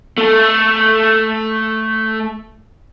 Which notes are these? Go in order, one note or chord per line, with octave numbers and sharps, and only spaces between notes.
A3 A4